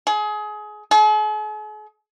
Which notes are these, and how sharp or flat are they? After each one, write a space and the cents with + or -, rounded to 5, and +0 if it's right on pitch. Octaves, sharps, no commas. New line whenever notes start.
G#4 +25
G#4 +45